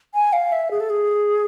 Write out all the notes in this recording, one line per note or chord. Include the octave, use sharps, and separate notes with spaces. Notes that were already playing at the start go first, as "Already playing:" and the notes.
G#5
F5
E5
G#4
A4
G#4